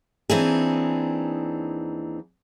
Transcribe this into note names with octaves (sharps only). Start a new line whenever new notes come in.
D#2 E3 C4 D4 D#4 G#4